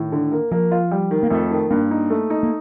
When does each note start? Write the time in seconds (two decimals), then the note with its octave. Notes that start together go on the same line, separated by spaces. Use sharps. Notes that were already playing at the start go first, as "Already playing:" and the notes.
Already playing: A2 D#3
0.12 D3
0.32 A#3
0.51 F3 A#3
0.71 F4
0.91 G3
1.11 D#3
1.23 A#3
1.30 F2 A3
1.51 D#3
1.70 G2 A#3
1.91 D#4
2.10 A3
2.30 D#4
2.43 A#3